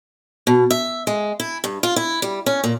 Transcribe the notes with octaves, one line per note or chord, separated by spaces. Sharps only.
B2
E5
G#3
E4
G2
F4
E4
G3
C#4
A#2